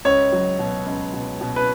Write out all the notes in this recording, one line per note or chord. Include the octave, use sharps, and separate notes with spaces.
C#2 C#5
F#3
B2
C#2
B2
B2
B4